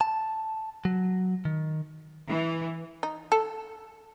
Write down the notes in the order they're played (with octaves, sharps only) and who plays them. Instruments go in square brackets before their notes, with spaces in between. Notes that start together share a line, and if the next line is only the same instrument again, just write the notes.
[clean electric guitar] A5
F#3
D#3
[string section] E3
[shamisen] D#4
A4